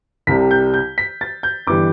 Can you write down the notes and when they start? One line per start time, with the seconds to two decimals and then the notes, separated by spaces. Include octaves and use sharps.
0.27 C2 C3 G3 B6
0.51 G6
0.74 G6
0.98 B6
1.21 A6
1.43 G6
1.67 G1 E3 G3 D6